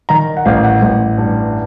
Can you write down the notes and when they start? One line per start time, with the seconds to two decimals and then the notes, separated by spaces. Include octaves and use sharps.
0.09 D#3 A#5
0.37 F#5
0.45 A1 F5
0.64 F#5
0.82 A1
1.18 G2